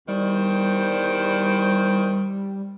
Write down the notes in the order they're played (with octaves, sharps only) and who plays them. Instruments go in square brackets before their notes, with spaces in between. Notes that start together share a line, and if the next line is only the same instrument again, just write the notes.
[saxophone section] E2 D#3 C5 [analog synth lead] G3